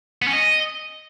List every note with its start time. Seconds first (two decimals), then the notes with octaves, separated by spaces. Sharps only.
0.22 B3
0.28 C#4
0.33 D#5